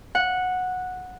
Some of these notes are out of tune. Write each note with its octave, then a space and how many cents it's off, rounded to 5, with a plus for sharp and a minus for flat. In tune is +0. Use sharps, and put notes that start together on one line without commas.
F#5 -10